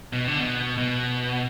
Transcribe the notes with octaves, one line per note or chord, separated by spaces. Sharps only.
B2
D3
B2
B2